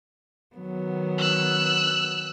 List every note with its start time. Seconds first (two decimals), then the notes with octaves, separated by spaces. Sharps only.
0.56 D#3 F#3 B3
1.18 E6 F#6